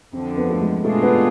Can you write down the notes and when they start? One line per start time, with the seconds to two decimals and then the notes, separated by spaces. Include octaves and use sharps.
0.13 F2 D3 F3 C4
0.37 B3
0.50 A3
0.61 G#3
0.85 B2 G#3 A3 D4 F4 G#4
1.03 B3